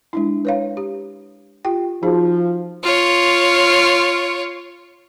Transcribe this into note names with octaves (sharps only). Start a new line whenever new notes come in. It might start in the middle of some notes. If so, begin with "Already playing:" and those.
G#3 D4 E4
B4 C#5 F5
G4
F4 G4 G5
F3 D#4 F#4 G#4
F4 C#5